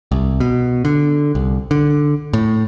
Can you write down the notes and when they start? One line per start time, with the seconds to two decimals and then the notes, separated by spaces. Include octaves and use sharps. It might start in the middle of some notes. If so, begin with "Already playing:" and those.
0.12 C2
0.40 B2
0.85 D3
1.35 C2
1.71 D3
2.33 A2